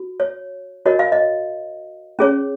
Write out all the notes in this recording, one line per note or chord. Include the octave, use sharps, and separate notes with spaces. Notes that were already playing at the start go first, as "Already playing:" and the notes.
Already playing: F#4
C#5
F#4 A#4 C#5 D#5
F5
D#5
C#4 G#4 C#5